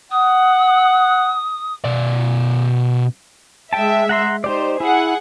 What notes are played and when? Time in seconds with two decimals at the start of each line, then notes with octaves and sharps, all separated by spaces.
0.11 F#5 D#6
1.84 B2 D5
3.73 G#3 E5 G5 A5
4.09 F#5 A#5 C6
4.44 D#4 G4 C5 D5
4.80 E4 G#4 F#5